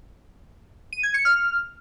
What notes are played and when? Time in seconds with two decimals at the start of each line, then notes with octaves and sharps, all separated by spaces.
0.93 D#7
1.03 G#6
1.14 C#7
1.25 F6